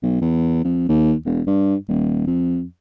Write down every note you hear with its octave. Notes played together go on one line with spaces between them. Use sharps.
B1
E2
F2
D#2
E1
G2
D#1
F2